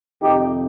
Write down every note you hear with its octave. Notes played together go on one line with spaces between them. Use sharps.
F2 C3 D#3 D#4 G4